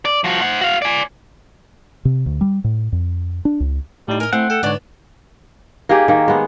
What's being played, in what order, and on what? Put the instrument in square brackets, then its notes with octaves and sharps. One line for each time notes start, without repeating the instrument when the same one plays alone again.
[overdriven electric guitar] D5
F3 F#4
C5 F#5
F#4 F5
D5 G#5
[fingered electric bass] C3
D2
G3
A2
F2
D4
C#2
[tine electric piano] A2 D#4 [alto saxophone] G3
[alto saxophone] A#4 [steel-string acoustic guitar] D#5 G#5
[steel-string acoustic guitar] A3 [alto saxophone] C4 [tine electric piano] E4 [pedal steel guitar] F#5
[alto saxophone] A4 [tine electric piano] G5
[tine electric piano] G#2 D3 C#5 [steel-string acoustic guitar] B3 D4 [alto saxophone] D5
[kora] A#3 D#4 G4 G#4
D#3 A#3
G#3 B3